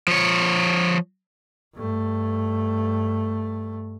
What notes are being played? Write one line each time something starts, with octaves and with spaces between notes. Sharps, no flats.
F3 C#5
G2 A3